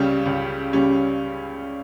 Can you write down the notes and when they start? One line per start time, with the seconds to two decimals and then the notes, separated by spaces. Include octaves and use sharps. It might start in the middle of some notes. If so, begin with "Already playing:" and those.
Already playing: C#2 C#3 G3 C#4 G4
0.26 C#2
0.72 C#3 G3 C#4 G4